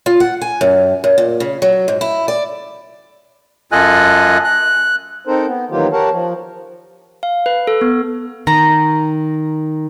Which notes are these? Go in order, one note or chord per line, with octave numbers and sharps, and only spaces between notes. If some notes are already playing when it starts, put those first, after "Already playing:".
F4
F#5
G#5
F#2
F#2
A#2
C#3
F#3
G#2
E4
D5
F#2 F4 A4 D#5 G#5 F#6
F#6
C4 D#4 A4 A#4 C5
B3
D#3 E3 F#3 A#3 F4 G4
G4 A#4 C#5 F5 F#5 A5
F3
F5
B4
A4
B3
D#3 A#5